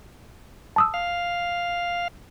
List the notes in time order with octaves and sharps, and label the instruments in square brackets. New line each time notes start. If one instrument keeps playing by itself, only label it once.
[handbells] A5 D#6 E6
[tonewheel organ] F5